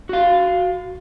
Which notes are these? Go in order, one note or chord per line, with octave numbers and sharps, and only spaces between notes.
F#4 F5